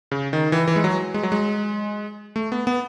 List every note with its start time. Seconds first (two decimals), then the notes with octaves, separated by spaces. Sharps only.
0.11 C#3
0.33 D#3
0.52 E3
0.68 E3
0.76 G#3
0.84 F#3
1.14 G#3
1.23 F#3
1.32 G#3
2.36 A3
2.52 B3
2.67 B3